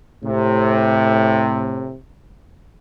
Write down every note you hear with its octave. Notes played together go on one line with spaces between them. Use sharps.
A2 C3